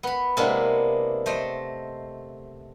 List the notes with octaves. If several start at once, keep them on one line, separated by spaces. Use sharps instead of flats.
B3 B5
C3 G#3 A#3 B3 D4 E4
A3 C5 D#5